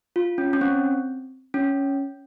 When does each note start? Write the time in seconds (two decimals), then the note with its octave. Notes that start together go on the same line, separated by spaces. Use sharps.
0.16 F4
0.38 C#4
0.53 C#4
0.61 C4
1.54 C#4